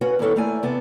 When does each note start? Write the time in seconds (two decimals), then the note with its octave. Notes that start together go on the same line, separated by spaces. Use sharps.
0.01 C#4 F#4 B4 F#5
0.19 E2 G2 D#3 E4 A4 C#5
0.36 A3 A#3 E4 D5 G#5
0.62 E2 C3 B3 A5